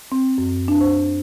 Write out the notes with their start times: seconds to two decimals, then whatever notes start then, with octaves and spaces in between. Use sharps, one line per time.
0.12 C4
0.38 F#2
0.68 D4
0.80 C5